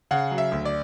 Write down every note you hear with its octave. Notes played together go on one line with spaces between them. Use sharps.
C#3 F#5
F#3
E5
D2
D5